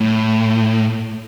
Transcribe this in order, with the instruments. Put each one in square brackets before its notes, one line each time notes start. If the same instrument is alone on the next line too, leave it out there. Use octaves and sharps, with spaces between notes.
[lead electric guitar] A2